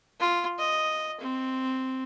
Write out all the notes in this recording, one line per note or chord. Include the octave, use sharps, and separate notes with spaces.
F4
D#5
C4